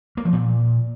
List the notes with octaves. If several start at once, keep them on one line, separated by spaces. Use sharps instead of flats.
A#3
F3
A#2